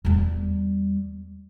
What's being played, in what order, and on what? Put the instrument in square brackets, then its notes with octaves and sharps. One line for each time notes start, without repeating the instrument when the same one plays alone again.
[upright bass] E2 G3